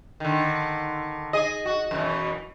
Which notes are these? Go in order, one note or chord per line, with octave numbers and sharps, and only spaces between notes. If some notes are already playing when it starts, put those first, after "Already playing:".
D3 D#3
G#4 D#5
F#4
F#2 B2 E3